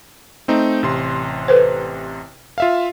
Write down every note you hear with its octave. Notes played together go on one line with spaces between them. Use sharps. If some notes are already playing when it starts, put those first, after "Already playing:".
A3 C4 D#4
A1 C3 C6
A4 B4 C5
F4 E5 F5